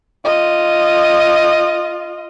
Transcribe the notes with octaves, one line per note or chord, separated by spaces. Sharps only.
F4 D#5